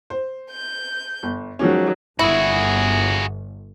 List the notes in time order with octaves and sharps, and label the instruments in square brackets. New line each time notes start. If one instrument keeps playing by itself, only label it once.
[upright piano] C5
[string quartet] G6
[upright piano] G1
[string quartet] D#3 F#3 [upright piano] F3 G#3 C#4
[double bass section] G1 [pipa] E4 [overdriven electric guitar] F#4 G#4